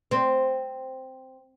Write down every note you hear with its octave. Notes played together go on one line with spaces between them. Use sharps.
C4